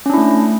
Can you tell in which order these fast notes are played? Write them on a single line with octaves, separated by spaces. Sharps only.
C#4 D4 E4 A3